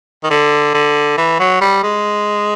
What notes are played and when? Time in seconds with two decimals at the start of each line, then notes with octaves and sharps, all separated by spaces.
0.24 D#3
0.30 D3
0.74 D3
1.18 E3
1.40 F#3
1.61 G3
1.83 G#3